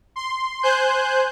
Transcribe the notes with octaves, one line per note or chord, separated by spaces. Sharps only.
C6
C5 G#5 F#6 G6